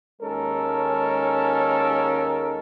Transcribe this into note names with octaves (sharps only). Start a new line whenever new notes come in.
D#2 G#3 C#4 A4 A#4